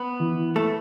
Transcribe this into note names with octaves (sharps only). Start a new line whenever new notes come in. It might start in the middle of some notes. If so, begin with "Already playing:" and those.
Already playing: B3 B4
E3
A3 E4 A4